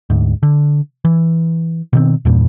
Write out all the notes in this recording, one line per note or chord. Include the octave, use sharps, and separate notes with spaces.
D2 G#2
D3
E3
B2 D#3 C4
E2 G2 A#2